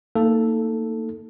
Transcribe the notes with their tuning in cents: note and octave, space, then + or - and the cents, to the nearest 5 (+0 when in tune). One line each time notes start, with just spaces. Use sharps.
A#3 -30 D#4 +10 A4 +0